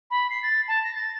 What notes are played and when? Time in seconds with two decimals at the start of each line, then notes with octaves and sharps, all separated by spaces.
0.11 B5
0.30 C7
0.43 A6
0.68 A5
0.84 A#6
0.95 A6